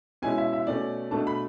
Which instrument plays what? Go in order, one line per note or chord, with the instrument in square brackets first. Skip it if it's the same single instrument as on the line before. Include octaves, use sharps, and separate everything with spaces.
[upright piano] B2 G#3 C#4 E4 G#5
E5
E5
B2 A3 C#4 D5
B2 A3 D4 A5
B5